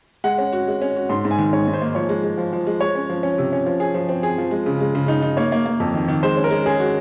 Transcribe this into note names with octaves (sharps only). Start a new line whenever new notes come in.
G#3 F#5
C#4
F#4
G#3
C#4
F#4
G#2 C6
G#2
G#5
D#3
G#2 C#5
G#2
C5
A#3
F3 C#5
G#3
G#3
F3
F3
G#3
G#3 C#5
C#4
F3
C#4
C3
C#4
F3
G#4
F3
C4
G#4
F3
G#3
C#3
G#3
C#3
D#4
D#4
A#3 C#5
A#3
A#3
F2
D#3
D#3
G#3 C5
C#4
A#4
G#3
C#4 G#4
F#4